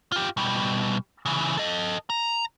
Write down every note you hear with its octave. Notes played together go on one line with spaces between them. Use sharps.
F4 G4
B2 G3
C#3 E3
A4 D#5
A#5